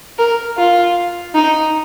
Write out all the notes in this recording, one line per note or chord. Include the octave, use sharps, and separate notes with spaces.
A#4
F4
D#4